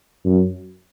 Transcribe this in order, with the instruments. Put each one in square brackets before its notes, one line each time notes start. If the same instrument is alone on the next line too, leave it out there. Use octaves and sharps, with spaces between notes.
[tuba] F#2